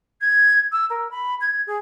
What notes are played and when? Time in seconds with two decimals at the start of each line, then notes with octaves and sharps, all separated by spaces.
0.21 G#6
0.72 E6
0.89 A#4
1.11 B5
1.40 G#6
1.66 G#4